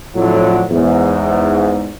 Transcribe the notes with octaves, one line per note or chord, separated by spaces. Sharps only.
F2 A2 D3 F#3 E4 F4
E2 G#2